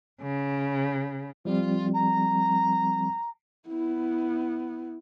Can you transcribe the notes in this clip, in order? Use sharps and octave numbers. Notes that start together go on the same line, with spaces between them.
C#3
F3 G3 C4 F4
A#5
B3 E4